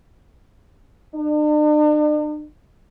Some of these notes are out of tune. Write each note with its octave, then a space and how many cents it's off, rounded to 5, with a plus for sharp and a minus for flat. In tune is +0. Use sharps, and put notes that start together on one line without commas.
D4 +45